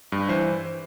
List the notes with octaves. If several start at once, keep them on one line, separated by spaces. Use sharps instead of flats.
G2
E3 C5